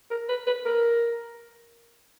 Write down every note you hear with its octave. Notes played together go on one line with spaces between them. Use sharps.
A#4
B4
B4
A#4